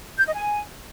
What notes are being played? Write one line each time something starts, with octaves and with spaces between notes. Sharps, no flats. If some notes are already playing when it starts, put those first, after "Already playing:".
G6
D#5
G#5